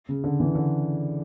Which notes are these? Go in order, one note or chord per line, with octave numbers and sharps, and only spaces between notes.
C#3
D3
E3
D3